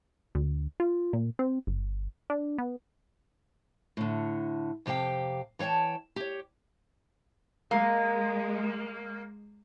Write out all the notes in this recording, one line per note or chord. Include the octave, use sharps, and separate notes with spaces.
D2
F4
A#2
C4
G1
D4
B3
A2 D3
F2 C3 G4 F5 G5
E3 C#5 F5 G5 A5
G4 C#5
G#3 A#3